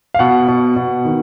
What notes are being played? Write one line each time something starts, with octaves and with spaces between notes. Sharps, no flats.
F5
B2 F#5
B2
B2
D#3